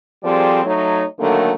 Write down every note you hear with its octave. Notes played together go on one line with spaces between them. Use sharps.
F3 G3 C4 G#4 A4 D5
F#3 A3 D#4 C#5
D3 D#3 F#3 A3 A#3